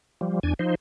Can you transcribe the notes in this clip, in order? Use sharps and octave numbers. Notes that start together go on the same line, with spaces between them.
F3 G3
E2 D4 G#5
F3 D#4 C5